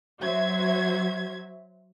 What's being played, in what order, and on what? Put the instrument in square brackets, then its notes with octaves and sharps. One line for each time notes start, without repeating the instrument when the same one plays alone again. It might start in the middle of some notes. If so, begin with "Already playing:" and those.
[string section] F#3 F#4 C5 E5 G#6